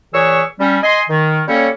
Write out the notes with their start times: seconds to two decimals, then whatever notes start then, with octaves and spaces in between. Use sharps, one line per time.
0.13 A#2 E3 G#4 C#5 C#6 E6
0.60 G3 C#4
0.83 D#5 G#5 C6
1.09 D#3
1.48 G3 A#3 C#4 A4 C#5